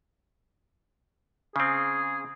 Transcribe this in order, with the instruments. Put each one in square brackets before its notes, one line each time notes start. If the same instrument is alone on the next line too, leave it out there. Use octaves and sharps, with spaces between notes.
[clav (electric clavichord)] C#3 C4 [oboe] G#4